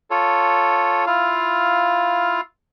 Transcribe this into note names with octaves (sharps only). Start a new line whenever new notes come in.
F4 A4 C#5
E4 F4 F5